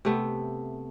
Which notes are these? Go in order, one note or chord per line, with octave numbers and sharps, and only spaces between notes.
C3 A3 B3